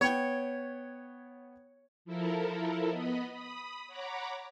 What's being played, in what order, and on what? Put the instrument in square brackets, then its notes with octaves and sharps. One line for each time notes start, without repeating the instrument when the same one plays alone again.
[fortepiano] B3 G5 [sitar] C#5
[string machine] F3 E4 A4 A#4
B3 D#5 B5
B5 D#6
C#5 F#5 A#5 B5 D6